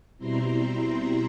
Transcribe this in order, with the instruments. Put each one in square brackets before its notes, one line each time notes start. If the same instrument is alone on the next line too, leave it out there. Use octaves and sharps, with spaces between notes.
[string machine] B2 G3 C4 E4 A#5 C6